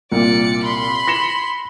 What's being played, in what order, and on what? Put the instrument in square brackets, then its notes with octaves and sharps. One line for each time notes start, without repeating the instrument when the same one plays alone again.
[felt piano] C2 A#2 [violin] D5 C#7
[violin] B5 C6
[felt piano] A#6 C#7 E7